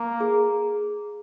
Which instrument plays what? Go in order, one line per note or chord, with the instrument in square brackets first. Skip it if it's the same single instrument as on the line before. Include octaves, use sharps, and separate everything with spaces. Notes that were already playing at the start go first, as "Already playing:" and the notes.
Already playing: [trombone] A#3
[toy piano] G#4